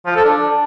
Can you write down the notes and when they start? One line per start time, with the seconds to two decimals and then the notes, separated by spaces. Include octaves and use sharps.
0.06 F3
0.15 A4
0.24 D4